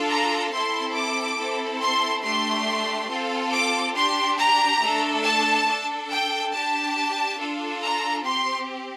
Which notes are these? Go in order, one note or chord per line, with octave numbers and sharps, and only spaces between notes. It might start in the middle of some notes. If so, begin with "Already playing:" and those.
Already playing: D4 F4 A4
A#5
C4 E4 A4 C6
D6
C4 E4 A4
C6
A3 D4 G4 C6
C4 F4 A4
D6
D4 G4 C6
A#5
A3 D4 A4
A5
D4 A4
G5
D4 G4 A5
D4 F4 A4
A#5
C4 G4 C6